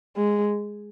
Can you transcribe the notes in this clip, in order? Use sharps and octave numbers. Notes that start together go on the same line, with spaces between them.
G#3